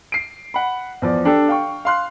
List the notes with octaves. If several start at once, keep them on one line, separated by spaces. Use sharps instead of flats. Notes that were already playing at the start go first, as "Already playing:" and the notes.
C7 D7
F#5 B5
E2 F3 D5
D4 G4 A4
F5 G5 C#6
F5 C6 F#6